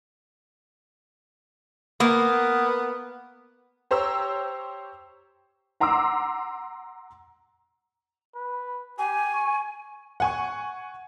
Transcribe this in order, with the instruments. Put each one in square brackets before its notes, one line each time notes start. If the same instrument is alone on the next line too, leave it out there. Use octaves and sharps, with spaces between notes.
[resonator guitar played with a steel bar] A#3 [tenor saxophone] B3
[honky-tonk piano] G4 C5 C#5 A#5 E6
F#5 A#5 C6 D6 E6
[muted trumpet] B4
[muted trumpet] G4 [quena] G#5
[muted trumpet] C#6
[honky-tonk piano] F#5 G#5 C#6